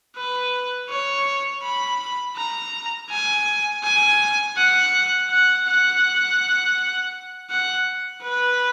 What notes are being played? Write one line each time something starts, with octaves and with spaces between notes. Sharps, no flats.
B4
C#5
B5
A#5
G#5
G#5
F#5
F#5
F#5
F#5
B4